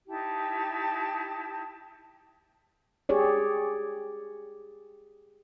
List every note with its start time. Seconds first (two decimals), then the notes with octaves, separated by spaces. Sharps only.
0.08 D#4 E4 G4 A5
3.09 G4 G#4 C#5 D5